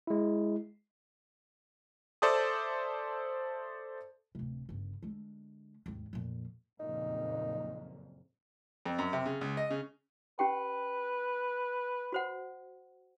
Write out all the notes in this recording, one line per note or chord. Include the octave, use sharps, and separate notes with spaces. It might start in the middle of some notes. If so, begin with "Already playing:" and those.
G#3 E4
A4 C5 D5 E5 A5 D#6
D1 C3
G1 C#3
D3 G#3
G#1 D#2
F2 A#2
F#1 F2 A#2 D#4
F2
F#2
C3
C#3
C#2
D#5
C#3
C#4 G4 B4 G5
F#4 C5 F#5